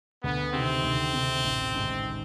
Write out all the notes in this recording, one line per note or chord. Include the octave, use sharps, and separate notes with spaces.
D2 B3
C3 D#3 C4
D2
C3 D#3
A1
G#2 D#3